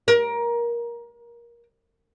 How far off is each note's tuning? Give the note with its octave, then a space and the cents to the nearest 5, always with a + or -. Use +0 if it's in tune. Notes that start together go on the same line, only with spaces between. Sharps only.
A#4 +20